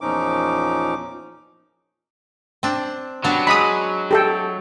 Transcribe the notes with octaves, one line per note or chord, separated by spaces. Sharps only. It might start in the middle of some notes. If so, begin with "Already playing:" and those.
E2 A#2 F3 C#4 D#4 D6
C4 D4
F#3 G3 B3 D4
G#3 G#4 B5 D#6
G4 A4 G5